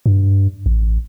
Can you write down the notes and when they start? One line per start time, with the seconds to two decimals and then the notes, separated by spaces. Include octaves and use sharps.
0.06 G2
0.66 A1